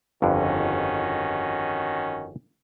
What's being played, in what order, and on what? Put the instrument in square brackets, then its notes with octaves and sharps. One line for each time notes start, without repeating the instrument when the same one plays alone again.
[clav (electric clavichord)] G1 F2 D3 [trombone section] D#3 C#4 F#4